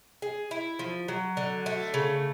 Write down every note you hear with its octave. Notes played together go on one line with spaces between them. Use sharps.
G#4
E4
F3
F#3
D3
A3
C#3